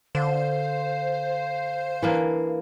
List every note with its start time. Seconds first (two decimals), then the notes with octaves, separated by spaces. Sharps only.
0.15 D3 C5 F5
2.03 E3 A#3 D4